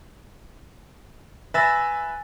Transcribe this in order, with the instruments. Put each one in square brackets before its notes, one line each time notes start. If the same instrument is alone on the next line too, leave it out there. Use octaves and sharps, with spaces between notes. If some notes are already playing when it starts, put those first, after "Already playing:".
[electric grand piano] B4 E5 A6 [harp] G#5 E6 A#6